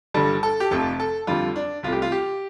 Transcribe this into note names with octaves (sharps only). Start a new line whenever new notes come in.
G1 G2 D3 G3 A4
A4
G4
F1 F2 C3 F3 A3 A4
A4
F2 D3 G3 F4
D4
C2 C3 A3 F4
G4
F4
G4